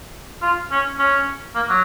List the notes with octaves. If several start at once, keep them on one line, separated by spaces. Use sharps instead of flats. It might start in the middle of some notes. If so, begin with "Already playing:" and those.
F4
C#4
C#4
A#3
F#3